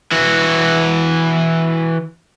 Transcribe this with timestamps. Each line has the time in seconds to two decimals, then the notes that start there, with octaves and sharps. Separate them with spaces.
0.12 E3 F#4